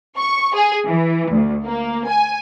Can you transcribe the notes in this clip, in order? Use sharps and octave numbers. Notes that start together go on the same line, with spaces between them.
C#6
G#4
E3
D2
A#3
G#5